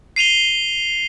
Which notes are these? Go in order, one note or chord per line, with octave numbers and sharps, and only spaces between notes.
C7 D#7 F7 G7